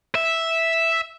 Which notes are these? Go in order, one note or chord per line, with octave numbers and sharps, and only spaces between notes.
E5